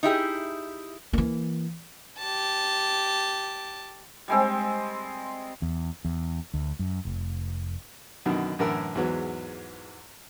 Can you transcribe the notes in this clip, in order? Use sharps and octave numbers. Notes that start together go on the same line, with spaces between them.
D#4 E4 G4 G#4
E3 A#3
G4 A5
G3 G#3 C4
E2
E2
D2
F#2
F1
F#2 B2 D3 D#3
F#2 A2 D3 E3 A#4 E6
E2 G#2 F#3 B3